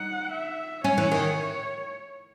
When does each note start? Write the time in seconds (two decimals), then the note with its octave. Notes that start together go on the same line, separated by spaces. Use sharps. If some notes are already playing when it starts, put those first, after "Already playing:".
Already playing: D#4 F#5
0.32 E5
0.84 C#4 C#5
0.98 E3
1.11 D#3